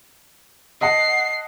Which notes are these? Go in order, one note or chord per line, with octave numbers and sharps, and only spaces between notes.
D#5 F#5 A5 C7